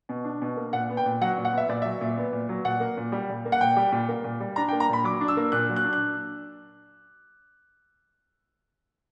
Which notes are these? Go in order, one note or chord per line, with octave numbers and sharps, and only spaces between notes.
B2
D4
B2
A#3
A#2 F#5
B3
G5
A#2
F#3 F#5
A#2
F#5
B3 E5
A#2 D5
F#3 E5
A#2
B3
A#2
F#3
A#2 F#5
A#3
A#2
G3
A#2
A#3
F#5
A#2 G5
G3
A#2
A#3
A#2
G3
D4 A#5
G5
A#3
A#5
A#2 B5
F#3 D6
D4
E6
A#3
A#2 F#6
F#3
F#6
D4
F#6